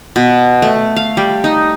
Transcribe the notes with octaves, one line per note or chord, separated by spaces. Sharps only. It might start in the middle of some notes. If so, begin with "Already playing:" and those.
B2
A3
F5
G3
D#4